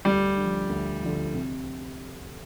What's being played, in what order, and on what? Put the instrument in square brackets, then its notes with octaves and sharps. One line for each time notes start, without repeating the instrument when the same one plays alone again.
[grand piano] D2 [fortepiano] G3
[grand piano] D3 F3
D2
D3 F3
C3